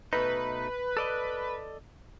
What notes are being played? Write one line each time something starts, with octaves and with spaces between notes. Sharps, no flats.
B2 A3 D#4 B4
A4 D5 D#5